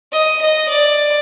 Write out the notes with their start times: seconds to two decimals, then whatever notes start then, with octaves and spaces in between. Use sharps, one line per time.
0.12 D#5
0.41 D#5
0.68 D5